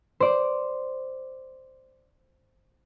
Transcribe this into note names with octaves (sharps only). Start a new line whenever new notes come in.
C5 D5